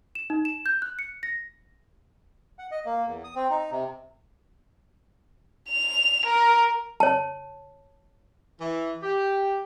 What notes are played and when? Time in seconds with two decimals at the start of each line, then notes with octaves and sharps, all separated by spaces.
0.15 E7
0.30 D#4
0.45 E7
0.66 G6
0.82 F#6
0.99 C#7
1.23 A#6
2.59 F#5
2.71 D#5
2.85 A#3
3.07 E2
3.24 D#6
3.35 C4
3.50 D#4
3.71 C3
5.69 F7
6.26 A#4
7.00 C#5 A5
8.61 E3
9.03 G4